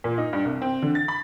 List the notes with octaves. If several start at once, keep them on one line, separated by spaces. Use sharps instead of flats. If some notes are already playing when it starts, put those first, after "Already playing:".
A#2
D#4
G2
C2
C4
D3
A6
B5